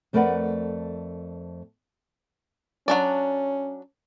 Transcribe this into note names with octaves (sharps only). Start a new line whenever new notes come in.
F2 A3 A#4 B4 D5 F#5
F#3 C#4 D4 D5